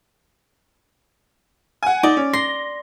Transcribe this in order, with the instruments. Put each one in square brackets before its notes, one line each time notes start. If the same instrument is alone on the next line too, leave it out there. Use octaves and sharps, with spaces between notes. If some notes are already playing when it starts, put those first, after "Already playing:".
[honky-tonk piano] F#5 G#5
[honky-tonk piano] D#4 [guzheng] D5
[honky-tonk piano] C#4
[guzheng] C6 [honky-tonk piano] A#6